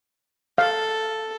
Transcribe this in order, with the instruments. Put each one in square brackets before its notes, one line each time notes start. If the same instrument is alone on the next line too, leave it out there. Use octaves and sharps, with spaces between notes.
[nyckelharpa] A4 [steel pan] F5